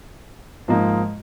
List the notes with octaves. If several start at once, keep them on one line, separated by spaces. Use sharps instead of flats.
G#2 F3 A#3 D#4